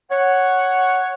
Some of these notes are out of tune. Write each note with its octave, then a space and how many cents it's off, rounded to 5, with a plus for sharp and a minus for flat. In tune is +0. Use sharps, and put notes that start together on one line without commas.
C#5 +0 F#5 +0